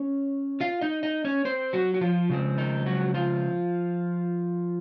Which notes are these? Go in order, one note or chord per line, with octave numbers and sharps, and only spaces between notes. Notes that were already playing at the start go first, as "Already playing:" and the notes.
Already playing: C#4 C#5
F4 F5
D#4 D#5
D#4 D#5
C#4 C#5
C4 C5
F#3 F#4
F#4
F3 F4
C#3 F3 G#3 C4
D#3 D#4
F#3 F#4
F3 F4